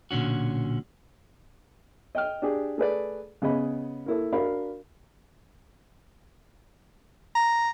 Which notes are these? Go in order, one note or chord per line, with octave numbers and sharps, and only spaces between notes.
B1 A#2 D3 C#4 F#4
D#5 G5 F6
D4 G4 G#4
A3 G#4 B4 D5
C#3 B3 G#4 D#5 B5
A#3 E4 A4
D4 F#4 A#4 F5 B5
A#5